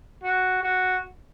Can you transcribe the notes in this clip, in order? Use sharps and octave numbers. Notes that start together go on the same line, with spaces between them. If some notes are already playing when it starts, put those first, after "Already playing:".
F#4
F#4